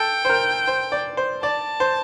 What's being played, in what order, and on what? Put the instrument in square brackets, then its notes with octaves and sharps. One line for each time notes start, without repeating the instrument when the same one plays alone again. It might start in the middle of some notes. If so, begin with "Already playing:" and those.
Already playing: [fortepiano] A4 [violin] G5
[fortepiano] C5
A#4
C5
D5
C5
[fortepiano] D5 [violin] A5
[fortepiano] C5